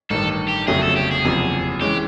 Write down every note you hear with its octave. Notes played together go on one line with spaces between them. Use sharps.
A1 G2 D#3 A4
G4
G1 F2 C#3 F#3 A3 G#4
A4
G4
G#4
F#1 E2 C3 F3
E3 G#3 C#4 G4